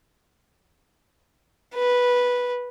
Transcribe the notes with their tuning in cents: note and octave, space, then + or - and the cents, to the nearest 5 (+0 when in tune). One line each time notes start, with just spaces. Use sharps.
B4 -10